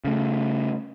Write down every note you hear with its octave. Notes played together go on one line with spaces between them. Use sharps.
C#3 A3